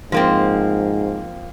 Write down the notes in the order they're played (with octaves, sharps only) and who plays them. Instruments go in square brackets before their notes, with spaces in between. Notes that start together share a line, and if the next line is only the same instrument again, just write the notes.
[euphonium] G#2 [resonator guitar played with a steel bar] F3 A#3 C4